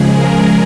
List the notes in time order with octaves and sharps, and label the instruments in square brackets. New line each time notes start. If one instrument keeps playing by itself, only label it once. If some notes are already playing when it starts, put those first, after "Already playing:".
Already playing: [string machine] C#3 F3 G#3 G#4
A#4